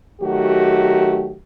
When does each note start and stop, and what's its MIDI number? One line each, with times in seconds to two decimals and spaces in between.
0.21 1.35 51
0.21 1.35 54
0.21 1.35 57
0.21 1.35 66
0.21 1.35 67